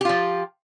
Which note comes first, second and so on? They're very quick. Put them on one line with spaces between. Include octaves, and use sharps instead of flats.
G4 F4 F3